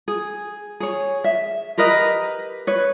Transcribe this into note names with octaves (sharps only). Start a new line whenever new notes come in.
G#4
G#4 C#5
E5
G4 A#4 B4 D#5
B4 C#5